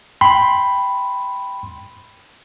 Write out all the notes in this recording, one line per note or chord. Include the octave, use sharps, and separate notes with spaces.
G5 B5 C6